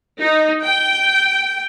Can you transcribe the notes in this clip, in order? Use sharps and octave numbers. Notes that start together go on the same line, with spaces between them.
D#4
G5